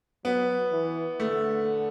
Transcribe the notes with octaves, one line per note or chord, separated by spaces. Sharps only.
F#3 B3
E3
D3 A3